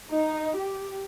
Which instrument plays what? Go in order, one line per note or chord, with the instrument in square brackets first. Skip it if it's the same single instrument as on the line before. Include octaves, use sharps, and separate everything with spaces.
[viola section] D#4
G4